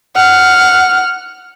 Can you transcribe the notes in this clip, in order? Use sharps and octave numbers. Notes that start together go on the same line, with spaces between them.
F#5 F6